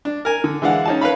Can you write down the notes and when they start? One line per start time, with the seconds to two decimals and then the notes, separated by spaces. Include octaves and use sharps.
0.05 D4
0.25 A#4 G#5
0.44 D3
0.62 E3 G#3 D4 F5 F#5
0.85 C#4 D#4 A5
1.01 B4 C#5 F5 B5